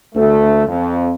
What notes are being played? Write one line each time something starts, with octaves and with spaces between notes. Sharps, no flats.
D2 A3
F2